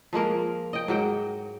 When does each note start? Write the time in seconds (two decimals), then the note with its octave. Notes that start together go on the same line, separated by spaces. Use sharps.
0.13 F3 G#3 A#3 A#4
0.73 D#5 G5
0.88 G#2 F#3 G5